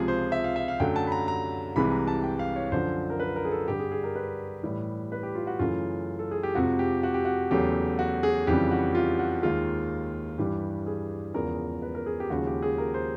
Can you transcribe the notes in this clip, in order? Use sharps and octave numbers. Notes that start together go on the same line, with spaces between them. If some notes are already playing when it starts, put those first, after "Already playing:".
Already playing: C#2 C3 F3 G#3 G#4
C5
E5
F5
E5
F5
F#2 D3 F#3 A3 G5
A5
B5
A#5
A#5
C2 C3 E3 G#3 B5
A#5
A5
G5
F5
C#5
F#2 D3 F3 C5
A#4
B4
A#4
G#4
A4
G2 D3 G3 G4
G#4
G#4
A#4
B4
A2 E3 G3
B4
G4
F4
F#4
F#2 C#3 E3 A3 F4
A4
G#4
G4
F2 C3 F3 G#3 F#4
G4
F#4
G4
F#4
E2 C#3 F#3 A3 G4
F#4
G#4
F2 C#3 E3 G3 G4
F#4
F4
F#4
D#2 D#3 G#3 F4
G2 E3 G3 G4
G#4
E2 C#3 F3 G#3 A#4
B4
A#4
G#4
G4
D#2 C#3 F3 G#3 F#4
G4
G#4
A#4
C5